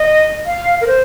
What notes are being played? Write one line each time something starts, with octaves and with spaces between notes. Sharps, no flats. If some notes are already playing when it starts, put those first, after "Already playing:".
Already playing: D#5
F5
A#4
C5